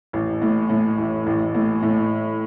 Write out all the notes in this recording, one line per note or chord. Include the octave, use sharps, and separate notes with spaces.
A1
A2
A2
A1
A1
A2
A2